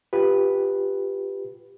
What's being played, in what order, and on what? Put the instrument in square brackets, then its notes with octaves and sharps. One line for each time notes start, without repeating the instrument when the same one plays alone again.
[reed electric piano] F4 G4 B4